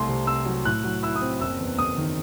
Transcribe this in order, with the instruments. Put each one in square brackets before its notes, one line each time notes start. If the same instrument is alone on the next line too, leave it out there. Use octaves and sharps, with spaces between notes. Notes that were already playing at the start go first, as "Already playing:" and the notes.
Already playing: [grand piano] C2 A3 C6
C3
C4 E6
F#3
A2 F#6
F#3
E4 E6
D#6
C4
F#1 E6
E2
F#1 D#6
D#3